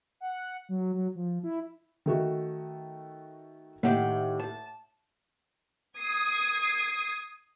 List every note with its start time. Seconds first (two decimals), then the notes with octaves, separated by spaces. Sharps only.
0.21 F#5
0.69 F#3
0.94 F#3
1.15 F3
1.44 E4
2.06 D#3 A3 F#4
3.83 A2 D#3 G4 F#5
4.39 A5
5.99 D#6 G#6 C7